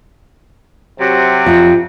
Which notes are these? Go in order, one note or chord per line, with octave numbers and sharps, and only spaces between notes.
C3 F#3
F2